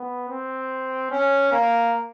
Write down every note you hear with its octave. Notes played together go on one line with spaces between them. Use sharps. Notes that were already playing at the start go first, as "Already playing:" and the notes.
Already playing: B3
C4
C#4
A#3